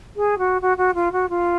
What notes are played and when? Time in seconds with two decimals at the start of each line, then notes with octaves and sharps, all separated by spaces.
0.16 G#4
0.38 F#4
0.62 F#4
0.77 F#4
0.94 F4
1.12 F#4
1.29 F4